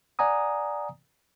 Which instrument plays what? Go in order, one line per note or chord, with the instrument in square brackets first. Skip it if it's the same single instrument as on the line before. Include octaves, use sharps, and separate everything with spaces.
[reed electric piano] D5 F#5 G#5 A#5 D#6